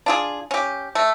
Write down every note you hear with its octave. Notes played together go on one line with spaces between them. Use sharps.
D4 F4 G#4
C#4 G4
A3